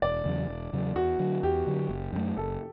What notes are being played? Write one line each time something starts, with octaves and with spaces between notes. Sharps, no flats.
E1 D5
E2 C#3 F#3
E1
E2 C#3 F#3
E2 F#4
D3 F#3
E2 G4
D3 F#3
F#1
F#2 E3 A3
F#1 A4